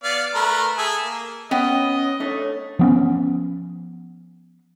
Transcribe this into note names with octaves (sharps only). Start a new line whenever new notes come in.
B3 D5 F5
A3 A#4 B4
G#4 A4 E5
A#3
B3 C#4 D#5 G5
A3 D4 A4 C#5
F3 B3 C#4